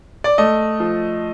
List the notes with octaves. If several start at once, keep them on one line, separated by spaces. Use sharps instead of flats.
D5
A3 D#5
F3